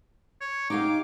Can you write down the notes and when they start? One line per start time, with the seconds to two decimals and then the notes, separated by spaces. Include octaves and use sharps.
0.41 C#5
0.70 D#4 G4 F5 D6